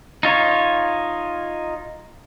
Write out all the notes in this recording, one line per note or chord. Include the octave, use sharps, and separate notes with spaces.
D#4 F4 C#5